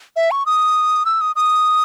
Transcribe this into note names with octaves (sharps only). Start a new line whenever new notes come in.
E5
C#6
D#6
E6
D#6
D#6